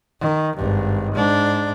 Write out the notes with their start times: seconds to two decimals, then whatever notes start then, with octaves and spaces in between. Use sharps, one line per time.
0.21 D#3
0.56 G#1 G2
1.14 G#2 D4